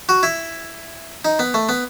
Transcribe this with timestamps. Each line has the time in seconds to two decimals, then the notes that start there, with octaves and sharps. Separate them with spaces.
0.09 F#4
0.23 E4
1.25 D#4
1.39 B3
1.54 A3
1.69 B3